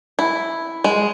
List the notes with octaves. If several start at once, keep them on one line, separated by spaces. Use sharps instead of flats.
E4
G#3